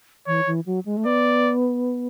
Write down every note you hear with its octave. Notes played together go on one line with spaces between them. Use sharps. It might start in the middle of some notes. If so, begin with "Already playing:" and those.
E3 C#5
E3
F#3
G#3
A3
B3 D5